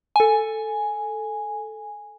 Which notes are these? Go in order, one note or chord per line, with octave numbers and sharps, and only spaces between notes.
A4 G#5